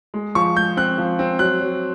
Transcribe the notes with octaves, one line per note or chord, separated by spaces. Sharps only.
G#3
F3 C#6
G#3 G6
C4 F#6
F3
C4
F#3 F#6
F#3